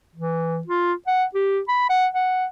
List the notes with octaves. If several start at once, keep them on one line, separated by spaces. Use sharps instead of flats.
E3
F4
F#5
G4
B5
F#5
F#5